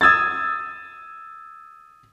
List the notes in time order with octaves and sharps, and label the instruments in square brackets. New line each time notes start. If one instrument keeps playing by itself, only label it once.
[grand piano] D#6 E6 G#6 A6